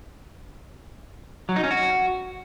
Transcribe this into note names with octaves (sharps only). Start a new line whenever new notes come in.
F#3
D#4
C#4
F#4